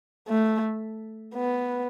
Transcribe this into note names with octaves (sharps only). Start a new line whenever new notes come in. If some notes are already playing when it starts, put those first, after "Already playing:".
A3
B3